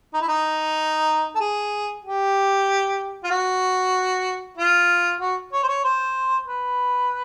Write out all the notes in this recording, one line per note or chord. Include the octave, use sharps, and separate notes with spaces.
D#4
E4
D#4
A4
G#4
G4
F4
F#4
F4
F#4
C#5
C5
C#5
C5
B4